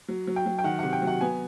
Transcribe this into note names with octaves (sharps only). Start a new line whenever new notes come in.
F#3
F#3
G5
F#3
G5
D#3 F#5
C3 F#5
G5
F#3
F#5
B3 G#5